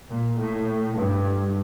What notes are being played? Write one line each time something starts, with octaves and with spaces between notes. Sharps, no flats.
A#2
A2
G2